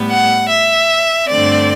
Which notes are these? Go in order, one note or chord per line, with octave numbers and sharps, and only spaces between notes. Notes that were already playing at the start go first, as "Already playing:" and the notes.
Already playing: A2 G3 B3
F#5
E5
G2 D3 A3 C4 D5